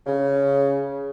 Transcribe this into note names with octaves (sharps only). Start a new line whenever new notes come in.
C#3